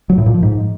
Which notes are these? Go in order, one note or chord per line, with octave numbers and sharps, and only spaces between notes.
F#3
A2
A#2
F3
G#2